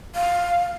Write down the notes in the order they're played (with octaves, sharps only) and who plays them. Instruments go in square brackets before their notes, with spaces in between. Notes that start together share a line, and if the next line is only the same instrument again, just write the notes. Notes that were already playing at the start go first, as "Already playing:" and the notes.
[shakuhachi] F5